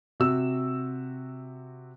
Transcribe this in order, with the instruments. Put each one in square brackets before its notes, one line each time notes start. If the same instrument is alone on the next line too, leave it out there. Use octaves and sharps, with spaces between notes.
[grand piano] C3 F#4 E6